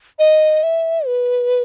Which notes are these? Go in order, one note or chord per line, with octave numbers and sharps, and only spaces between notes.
D#5
E5
B4